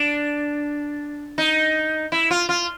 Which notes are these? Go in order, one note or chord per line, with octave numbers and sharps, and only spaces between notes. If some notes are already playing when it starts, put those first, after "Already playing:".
Already playing: D4
D#4
E4
F4
F4